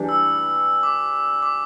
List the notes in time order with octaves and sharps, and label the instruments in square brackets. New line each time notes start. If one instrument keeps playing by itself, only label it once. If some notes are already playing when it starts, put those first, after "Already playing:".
Already playing: [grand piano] E3 G3 D4
[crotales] E6
D6
D6